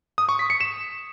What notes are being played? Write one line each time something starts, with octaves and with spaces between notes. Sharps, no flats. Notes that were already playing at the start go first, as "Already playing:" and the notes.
D#6
C#6
B6
C#7
E7